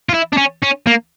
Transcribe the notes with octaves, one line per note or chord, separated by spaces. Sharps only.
F4
E4
D4
C#4
C#4
A#3